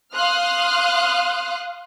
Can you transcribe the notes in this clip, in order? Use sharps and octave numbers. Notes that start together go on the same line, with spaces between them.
F5 C6 D#6 F6 F#6